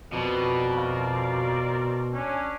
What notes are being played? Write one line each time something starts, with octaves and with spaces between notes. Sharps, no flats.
F2 B2 C4 A#4 B4 D5
F5
C#4 D4